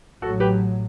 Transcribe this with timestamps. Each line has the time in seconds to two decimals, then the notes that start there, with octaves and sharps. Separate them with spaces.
0.22 A1 A2 F#3 F#4 A4
0.40 G4 B4